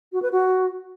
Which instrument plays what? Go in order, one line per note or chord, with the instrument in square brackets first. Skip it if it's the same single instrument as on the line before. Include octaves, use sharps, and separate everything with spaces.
[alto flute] F#4
B4
F#4